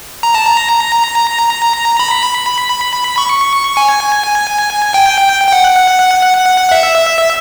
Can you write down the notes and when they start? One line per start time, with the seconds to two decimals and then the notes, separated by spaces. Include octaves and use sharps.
0.23 A#5
0.34 A5
0.45 A#5
1.99 B5
3.18 C#6
3.77 G#5
4.94 G5
5.47 G5
5.52 F#5
6.71 E5